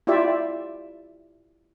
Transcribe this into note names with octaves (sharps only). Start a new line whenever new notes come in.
E4 F4 G4 D5 E5